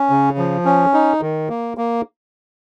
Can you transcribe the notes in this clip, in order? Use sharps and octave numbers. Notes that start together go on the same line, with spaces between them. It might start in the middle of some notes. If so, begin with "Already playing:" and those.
Already playing: C#4
C#3
F3
C#4
D#4
D#3
A#3
A#3